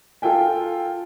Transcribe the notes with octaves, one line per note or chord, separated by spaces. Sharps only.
F4 A4 G5 G#5